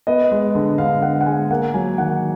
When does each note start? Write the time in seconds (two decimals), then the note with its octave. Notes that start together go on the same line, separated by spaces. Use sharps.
0.07 B3 D#5
0.31 G#3
0.55 D3
0.78 D3 F5
1.02 B3 F#5
1.21 F#5
1.26 G#3 G#5
1.50 A#3 F#5
1.74 F#3 G#5
1.98 D#3 F#5